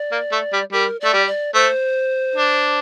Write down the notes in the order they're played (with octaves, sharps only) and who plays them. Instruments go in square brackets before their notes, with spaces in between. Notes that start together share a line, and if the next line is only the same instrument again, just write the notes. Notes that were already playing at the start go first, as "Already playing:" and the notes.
Already playing: [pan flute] D5
[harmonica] A#3
A3
G3
[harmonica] G3 [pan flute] A#4
[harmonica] A3 [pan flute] D5
[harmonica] G3
[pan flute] D5
[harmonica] A3 [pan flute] C5
[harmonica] D4